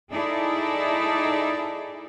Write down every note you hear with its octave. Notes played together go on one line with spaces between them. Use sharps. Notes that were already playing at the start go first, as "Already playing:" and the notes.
D#4 E4 G#4 A4 D5